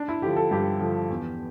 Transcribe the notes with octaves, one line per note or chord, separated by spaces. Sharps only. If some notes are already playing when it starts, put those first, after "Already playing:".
Already playing: D4
E4
D3 F3 G4
A4
G2 G4
D3 F3
E2